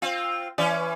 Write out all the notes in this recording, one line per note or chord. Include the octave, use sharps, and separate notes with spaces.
C4 F4
E3 C#4 D5